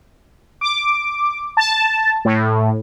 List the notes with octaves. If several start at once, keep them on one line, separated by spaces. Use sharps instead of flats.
D6
A5
A2